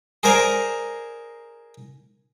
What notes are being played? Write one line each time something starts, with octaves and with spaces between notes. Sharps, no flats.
G#4 A#4 C5 D5 G#5 A#5